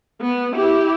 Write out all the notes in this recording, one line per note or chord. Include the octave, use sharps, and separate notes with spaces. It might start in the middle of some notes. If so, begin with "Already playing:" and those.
B3
E4 G4